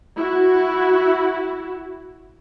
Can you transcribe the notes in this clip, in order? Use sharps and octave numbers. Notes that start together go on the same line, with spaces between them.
E4 F#4